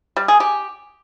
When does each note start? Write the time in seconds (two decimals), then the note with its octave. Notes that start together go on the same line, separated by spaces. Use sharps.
0.17 G3
0.28 G#4
0.40 G4